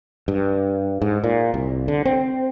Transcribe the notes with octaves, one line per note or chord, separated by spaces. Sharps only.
G2
G#2
A#2
C2
D3
C4